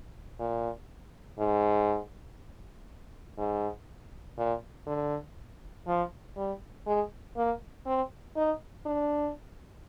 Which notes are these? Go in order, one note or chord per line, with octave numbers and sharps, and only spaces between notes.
A#2
G#2
G#2
A#2
D3
F3
G3
G#3
A#3
C4
D#4
D4